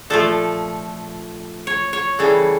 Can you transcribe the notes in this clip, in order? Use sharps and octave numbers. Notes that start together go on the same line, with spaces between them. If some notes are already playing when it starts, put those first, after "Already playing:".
A#2 F3 A3 A4
C#5
C#5
C#3 E3 G3 A4